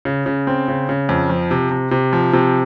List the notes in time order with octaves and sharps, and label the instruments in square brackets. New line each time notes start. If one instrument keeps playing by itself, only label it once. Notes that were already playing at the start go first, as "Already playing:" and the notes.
[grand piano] C#3
C#3
C4
C#3
C#3
F2
F3
C3
C3
C3
F3
C3